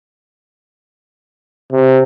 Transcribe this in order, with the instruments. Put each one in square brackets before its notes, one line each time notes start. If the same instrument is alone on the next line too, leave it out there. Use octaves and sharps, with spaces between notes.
[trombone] C3